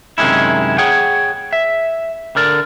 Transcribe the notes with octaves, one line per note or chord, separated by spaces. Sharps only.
F#2 C3 D#3 G#3 C#4 E4
G#4 C#5 F#5 G5
E5
D3 A#4 D5